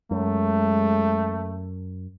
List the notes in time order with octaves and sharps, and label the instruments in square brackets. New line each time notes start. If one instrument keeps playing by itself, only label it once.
[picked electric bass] F#2 [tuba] G#3 [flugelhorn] A3